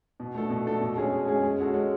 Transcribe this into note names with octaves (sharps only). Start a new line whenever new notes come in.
B2
A3 D4 A4
B2
A3 D4 A4
B2
G#3 C#4 G#4
B2
G#3 C#4 G#4
G#3
C#4 F#4 A4
G#3